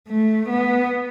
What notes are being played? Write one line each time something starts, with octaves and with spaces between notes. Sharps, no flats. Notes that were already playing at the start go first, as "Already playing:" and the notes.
A3
B3